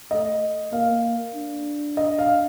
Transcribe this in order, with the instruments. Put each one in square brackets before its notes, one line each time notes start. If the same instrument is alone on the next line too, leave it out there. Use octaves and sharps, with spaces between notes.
[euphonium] A3 [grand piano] D#5
[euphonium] A#3 [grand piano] F5
[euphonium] D4
[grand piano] D#5
F5